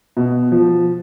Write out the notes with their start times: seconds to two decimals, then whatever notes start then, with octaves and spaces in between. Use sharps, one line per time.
0.17 B2
0.52 F3